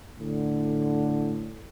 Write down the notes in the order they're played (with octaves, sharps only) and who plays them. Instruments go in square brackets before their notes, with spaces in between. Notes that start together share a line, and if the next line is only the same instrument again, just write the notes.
[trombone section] A2 D3